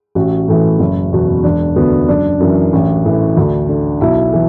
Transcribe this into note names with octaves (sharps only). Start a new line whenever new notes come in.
A1 F#4
A2 E3
F#1
E2 B2
E1 D4
D2 D3 B3
F#1 D4
F#2 E3
A1
A2 E3
D2
D3
B1 E4
E3